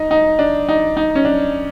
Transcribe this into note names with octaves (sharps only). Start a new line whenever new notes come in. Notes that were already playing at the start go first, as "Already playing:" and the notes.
Already playing: D#4
D#4
D4
D#4
D#4
C#4
D4